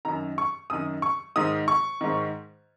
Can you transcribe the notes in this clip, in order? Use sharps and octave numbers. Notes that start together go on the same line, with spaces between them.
F#2 D#3 A#5
C#6
F#2 D#3 D#6
C#6
G#2 D#3 D#6
C#6
G#2 D#3